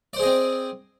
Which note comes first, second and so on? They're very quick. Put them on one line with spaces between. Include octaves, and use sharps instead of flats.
D5 C5 G#4 D#5 C4